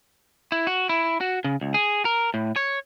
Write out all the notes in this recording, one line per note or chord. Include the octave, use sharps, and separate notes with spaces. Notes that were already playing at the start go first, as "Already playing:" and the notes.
E4
F#4
E4
F#4
C#3
C#2
G#4
A#4
A2
C#5